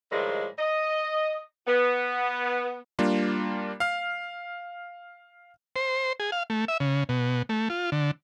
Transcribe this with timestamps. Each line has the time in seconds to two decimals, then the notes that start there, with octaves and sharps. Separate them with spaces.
0.11 A2 D#3 F3 G3 G#3
0.59 D#5
1.67 B3
2.99 G3 A#3 D4 F4
3.80 F5 F6
5.76 C5
6.20 G#4
6.32 F5
6.50 A3
6.68 E5
6.80 C#3
7.09 B2
7.49 A3
7.70 F4
7.92 D3